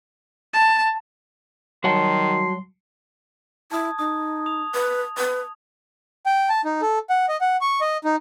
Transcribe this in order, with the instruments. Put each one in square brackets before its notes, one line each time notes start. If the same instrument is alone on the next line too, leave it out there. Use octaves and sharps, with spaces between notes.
[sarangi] A5
[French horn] D#3 [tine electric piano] F#3 G3 [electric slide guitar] F#4 F#5 A5 [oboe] C6
[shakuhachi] E4 [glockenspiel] A5 D#6 G#6
[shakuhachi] D#4 [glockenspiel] D#6
[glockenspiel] D#6 F7
[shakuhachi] B4
B4
[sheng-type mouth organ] G5
A5
D#4
A4
F#5
D#5
F#5
C#6
D#5
D#4